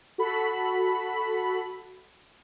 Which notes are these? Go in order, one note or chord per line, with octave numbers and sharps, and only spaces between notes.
F#4 A4 B5